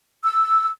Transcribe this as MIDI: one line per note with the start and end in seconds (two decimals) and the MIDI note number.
0.24 0.68 88